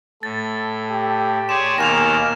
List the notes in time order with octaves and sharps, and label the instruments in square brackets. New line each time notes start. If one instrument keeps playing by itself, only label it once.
[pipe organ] A2 [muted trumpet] A4 [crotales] A6
[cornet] G4
[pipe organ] G#4 C#5 D5 [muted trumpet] C6 [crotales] E7
[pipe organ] D#2 B2 D#3 [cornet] A#3 [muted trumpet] G#5 [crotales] A#6 E7 F7